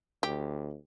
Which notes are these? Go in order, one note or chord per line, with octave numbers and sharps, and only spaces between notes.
D2 G4